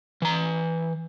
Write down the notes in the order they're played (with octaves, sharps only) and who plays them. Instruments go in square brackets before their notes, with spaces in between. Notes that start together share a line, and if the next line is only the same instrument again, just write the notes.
[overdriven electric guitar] E3 A#5